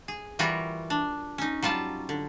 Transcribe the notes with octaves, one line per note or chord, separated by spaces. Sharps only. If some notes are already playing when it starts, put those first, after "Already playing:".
G#4
E3 G3 F4 F#4 A#4
D4
C#4 D#4
F#3 G3 F4 A5
D3